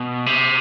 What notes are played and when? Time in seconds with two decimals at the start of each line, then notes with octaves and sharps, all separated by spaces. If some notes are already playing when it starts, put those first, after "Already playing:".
Already playing: B2
0.26 C3